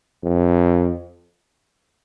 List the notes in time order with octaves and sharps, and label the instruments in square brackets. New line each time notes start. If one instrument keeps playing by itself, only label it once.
[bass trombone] F2